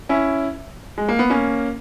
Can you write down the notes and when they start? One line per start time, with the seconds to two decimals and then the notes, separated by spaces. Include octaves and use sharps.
0.09 C#4 E4
0.98 G#3
1.09 A#3
1.19 B3
1.30 A#3 C#4